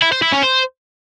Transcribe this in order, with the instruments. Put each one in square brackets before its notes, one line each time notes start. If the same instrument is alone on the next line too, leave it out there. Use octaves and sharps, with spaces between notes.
[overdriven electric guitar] E4
C5
E4
C#4
C5